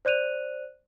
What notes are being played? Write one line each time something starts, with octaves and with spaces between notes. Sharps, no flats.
C5 D5 F#6 D#7 F7